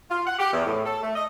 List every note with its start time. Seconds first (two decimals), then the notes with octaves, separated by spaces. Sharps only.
0.11 F4
0.27 F#5
0.39 G4
0.53 E2
0.66 A2
0.86 A4
1.03 A3
1.16 D#5